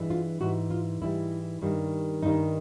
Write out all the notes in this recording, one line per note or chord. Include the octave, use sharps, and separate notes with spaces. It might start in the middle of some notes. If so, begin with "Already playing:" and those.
Already playing: G2 E3 G#3
F4
G#2 E3 G3 F#4
F4
G#2 E3 G3 E4
G2 D#3 G3
G2 D#3 G3 D#4